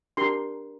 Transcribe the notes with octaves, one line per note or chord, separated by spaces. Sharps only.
D4 G4 A#4 C6